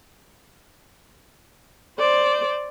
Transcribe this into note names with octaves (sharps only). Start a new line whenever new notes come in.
C5 D5